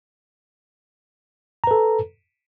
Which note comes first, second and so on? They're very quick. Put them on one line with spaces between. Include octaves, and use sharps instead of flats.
A#5 B4 A4